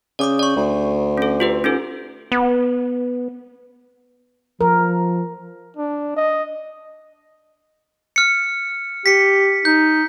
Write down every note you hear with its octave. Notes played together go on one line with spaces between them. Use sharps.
C#3 D5 D6 D#6
D5 C#6
D2
C#4 A4
F4 G4 B4
C#4 D#4 A4
B3
F3 A#4
D4
D#5
F6 C#7
G4 B6 C#7
D#4 G6